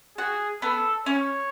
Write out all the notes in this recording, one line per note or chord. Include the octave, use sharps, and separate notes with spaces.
F#4 G#4
B3 A4
C#4 C#5